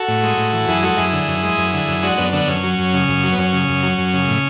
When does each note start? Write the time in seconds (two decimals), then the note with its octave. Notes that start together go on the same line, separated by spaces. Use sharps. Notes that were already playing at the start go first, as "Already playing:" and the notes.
Already playing: F#4 A4
0.08 A2
0.23 G#3
0.37 A2
0.53 E3
0.68 F#2 E4 G#4
0.83 G#3 F#4 A4
0.97 F#2 E4 G#4
1.13 D3
1.28 F#2
1.43 G#3
1.58 F#2
1.73 D3
1.88 F#2
2.03 G#3 D4 F#4
2.17 F#2 B3 D4
2.33 D3 B3 D4
2.48 F#2 C#4
2.63 F#3
2.79 F#2
2.94 C#3
3.08 F#2
3.24 F#3
3.33 B3
3.38 F#2 C#4
3.53 C#3
3.68 F#2
3.83 F#3
3.98 F#2
4.14 C#3
4.28 A2